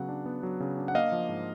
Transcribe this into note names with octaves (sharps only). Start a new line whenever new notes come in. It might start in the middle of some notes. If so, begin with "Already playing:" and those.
Already playing: C#3 F#3 B3 F#5
D4
B3
F#3
C#3
D4
F#5
A#3 D#5 F5
F3
G#2